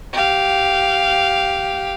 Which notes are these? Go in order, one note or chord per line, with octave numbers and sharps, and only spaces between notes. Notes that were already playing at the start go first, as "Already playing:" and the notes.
G4 F5